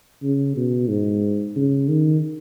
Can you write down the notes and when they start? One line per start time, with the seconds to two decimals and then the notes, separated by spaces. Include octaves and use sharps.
0.22 C#3
0.56 B2
0.89 G#2
1.56 C#3
1.89 D#3